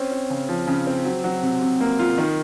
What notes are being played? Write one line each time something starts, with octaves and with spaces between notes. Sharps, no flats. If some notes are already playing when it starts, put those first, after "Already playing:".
Already playing: C4 C#4
C4
C#3
F3
C#3
C4
F#3
F#3
C3
C3
A#3
F4
D#3